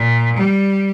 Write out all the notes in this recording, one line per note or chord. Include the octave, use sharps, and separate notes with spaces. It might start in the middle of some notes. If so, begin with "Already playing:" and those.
Already playing: A#2
G3